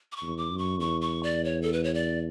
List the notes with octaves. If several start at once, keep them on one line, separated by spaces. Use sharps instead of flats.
D6
C#6
E2
D6
F#2
C#6
E2 C#6
C#6
D5
C#5
A4
B4
C#5
D5